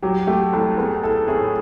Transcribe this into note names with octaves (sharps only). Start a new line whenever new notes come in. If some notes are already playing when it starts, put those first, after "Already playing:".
F#3 G4
A3 G4
C2 A4
B3 G#4
E4 A4
A2 G#4